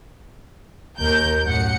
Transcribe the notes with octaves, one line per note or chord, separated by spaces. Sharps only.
D#2 A#4 G6
F#2 A2 F#5 C#7